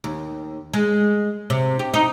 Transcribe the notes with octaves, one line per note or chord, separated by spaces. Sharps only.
D#2
G#3
C3
G4
D#4